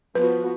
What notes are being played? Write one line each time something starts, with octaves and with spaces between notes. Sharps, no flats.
F3 B3 F#4 B4